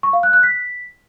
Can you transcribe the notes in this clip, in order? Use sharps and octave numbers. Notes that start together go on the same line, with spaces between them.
C#6
F5
F#6
F#6
B6